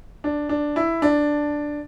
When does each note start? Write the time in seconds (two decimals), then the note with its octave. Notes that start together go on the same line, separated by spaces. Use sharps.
0.24 D4
0.49 D4
0.76 E4
1.02 D4